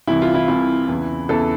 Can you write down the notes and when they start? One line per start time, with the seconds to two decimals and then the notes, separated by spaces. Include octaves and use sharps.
0.07 C2 C3 E3 E4
0.22 F4
0.34 E4
0.48 C2 C3 E3 E4
0.88 E2 C#3 E3
1.29 E2 C#3 E3 A4